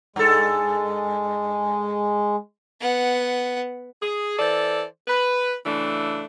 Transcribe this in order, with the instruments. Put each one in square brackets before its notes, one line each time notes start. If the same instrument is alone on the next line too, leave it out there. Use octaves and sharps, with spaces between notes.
[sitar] G2 A4 [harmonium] G#3
[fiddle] B3 F#5
[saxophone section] G#4
E3 A4 C5 D5
B4
C#3 E3 A3 D4